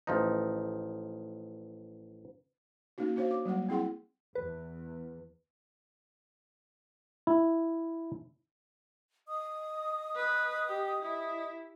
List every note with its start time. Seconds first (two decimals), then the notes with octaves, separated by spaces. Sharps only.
0.07 A1 F3 D#4
2.98 A#3 C#4 D#4 F#4
3.16 D4 F#4 C5 C#5 F5
3.31 D6
3.45 F#3 G3 A#3 F#5
3.69 C4 E4 G#4 F#5 C6
4.35 E2 B4
7.27 E4
9.28 D#5 D#6
10.16 B4
10.68 G4
11.02 E4